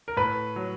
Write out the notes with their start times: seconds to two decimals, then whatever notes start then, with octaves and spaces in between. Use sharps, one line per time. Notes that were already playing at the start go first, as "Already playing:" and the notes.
0.08 A#4
0.16 A2 B4
0.56 F#3